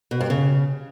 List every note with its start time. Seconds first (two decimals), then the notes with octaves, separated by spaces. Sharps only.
0.11 B2
0.21 G2
0.30 C#3